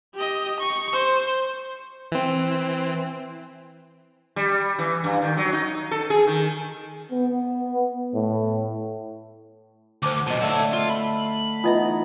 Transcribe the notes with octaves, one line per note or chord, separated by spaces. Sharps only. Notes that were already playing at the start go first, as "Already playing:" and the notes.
G4 D#5
C#6
C5
E3 C4
G3
E3
G2
D#3
F#3
D#4
A4
G#4
D#3
B3
A2
D2 C5 A5 D6
B1 A#2 D#5 A5
D3 A3 C#5 E5
F4
B5
E3 B3 D#4 F4 D#5 E5